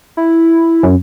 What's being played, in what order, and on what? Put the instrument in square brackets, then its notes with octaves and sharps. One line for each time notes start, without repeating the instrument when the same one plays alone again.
[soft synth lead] E4
[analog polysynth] F#2